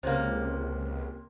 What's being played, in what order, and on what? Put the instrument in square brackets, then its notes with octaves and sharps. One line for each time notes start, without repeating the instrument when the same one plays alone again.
[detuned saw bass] C#2 [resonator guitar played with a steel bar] C3 A#3 [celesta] C5 C#5